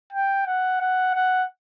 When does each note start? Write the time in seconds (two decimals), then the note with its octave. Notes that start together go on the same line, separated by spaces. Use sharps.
0.13 G5
0.47 F#5
0.81 F#5
1.15 F#5